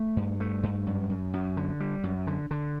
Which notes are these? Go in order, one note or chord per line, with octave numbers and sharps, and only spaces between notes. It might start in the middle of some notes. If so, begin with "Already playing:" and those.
Already playing: A3
G2
A3
G2
F#2
F#2
F#2
D3
G3
F#2
D3
D3